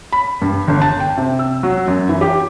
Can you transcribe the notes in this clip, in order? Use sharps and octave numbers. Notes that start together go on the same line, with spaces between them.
B5
G2
G1
A5
G5
C3
E6
F#3
F#2
E3
G4